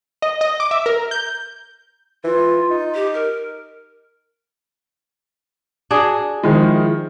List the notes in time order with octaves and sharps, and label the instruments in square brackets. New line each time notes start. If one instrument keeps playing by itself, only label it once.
[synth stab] D#5
D#5
D6
E5
A#4
G6
[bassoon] E3 [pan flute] F4
[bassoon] D#4
[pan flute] G4
A#4
[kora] D4 F#4 G#4
[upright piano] D#3 F3 G#3 [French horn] E4